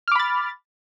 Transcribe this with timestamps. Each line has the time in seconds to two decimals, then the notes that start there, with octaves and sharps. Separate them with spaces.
0.08 F6
0.12 D6
0.16 B5
0.19 A6